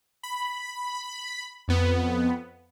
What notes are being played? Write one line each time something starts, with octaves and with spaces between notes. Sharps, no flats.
B5
F2 B3